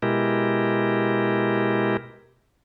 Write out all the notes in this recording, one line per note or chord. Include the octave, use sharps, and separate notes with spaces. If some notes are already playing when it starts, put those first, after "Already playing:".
B2 G#3 E4 G4 A#4